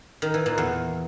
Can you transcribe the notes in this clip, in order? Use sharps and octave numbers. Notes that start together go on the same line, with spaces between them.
D#3
E3
A#2
E2